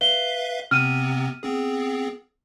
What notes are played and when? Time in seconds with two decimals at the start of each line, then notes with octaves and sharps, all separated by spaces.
0.01 B4 E5 F5 G7
0.71 C3 B3 C4 F6 D#7
1.43 B3 C4 G#4